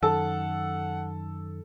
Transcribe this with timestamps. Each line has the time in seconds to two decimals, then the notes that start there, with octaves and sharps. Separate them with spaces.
0.03 F#2 D#3 A4 F#5